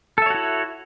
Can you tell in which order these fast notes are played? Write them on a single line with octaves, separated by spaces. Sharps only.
A4 E5 C#5 F#4 E4